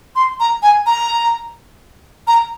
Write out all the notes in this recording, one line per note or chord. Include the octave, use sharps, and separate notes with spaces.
C6
A#5
G#5
A#5
A#5